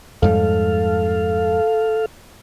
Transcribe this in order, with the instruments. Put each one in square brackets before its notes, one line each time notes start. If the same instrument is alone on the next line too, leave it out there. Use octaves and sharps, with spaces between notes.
[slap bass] F2 G#2 G3 [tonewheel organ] A4 F5